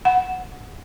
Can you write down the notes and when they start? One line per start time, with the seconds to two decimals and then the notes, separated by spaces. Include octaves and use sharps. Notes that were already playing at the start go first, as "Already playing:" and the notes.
0.05 F#5